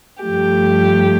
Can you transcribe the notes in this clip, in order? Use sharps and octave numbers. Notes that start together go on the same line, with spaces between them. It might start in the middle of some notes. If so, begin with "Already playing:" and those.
G2 F3 A3 G4